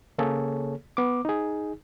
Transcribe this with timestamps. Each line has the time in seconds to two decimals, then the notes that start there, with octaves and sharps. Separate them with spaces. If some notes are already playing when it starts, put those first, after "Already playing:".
0.18 C#3 A#3 G#4 A4 C#5
0.97 B3 D6
1.25 D#4 G#4